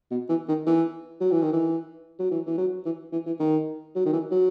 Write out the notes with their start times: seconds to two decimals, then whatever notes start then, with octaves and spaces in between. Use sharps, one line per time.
0.11 B2
0.29 E3
0.49 D#3
0.67 E3
1.21 F#3
1.31 E3
1.42 D#3
1.53 E3
2.20 F#3
2.31 E3
2.47 E3
2.58 F#3
2.86 E3
3.13 E3
3.26 E3
3.40 D#3
3.95 F#3
4.06 D#3
4.13 E3
4.32 F#3